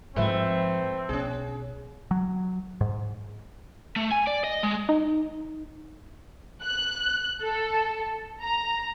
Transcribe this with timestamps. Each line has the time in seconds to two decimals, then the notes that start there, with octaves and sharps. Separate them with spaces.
0.16 G#2 F3 A3 C4 B4 E5
1.09 B1 C#4 G#4
2.11 F#3
2.81 G#2
3.96 A3
4.12 G#5
4.27 D5
4.44 D#5
4.63 G#3
4.89 D#4
6.62 F#6
7.41 A4
8.42 A#5